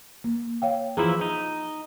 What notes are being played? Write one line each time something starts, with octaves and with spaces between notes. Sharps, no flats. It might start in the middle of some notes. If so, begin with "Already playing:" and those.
A#3
C#5 F5 G5
E3 F3 E4 G#4 A#5
D#4